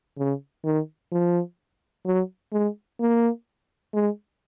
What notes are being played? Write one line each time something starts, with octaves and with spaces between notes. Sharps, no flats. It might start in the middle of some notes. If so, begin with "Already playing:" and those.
C#3
D#3
F3
F#3
G#3
A#3
G#3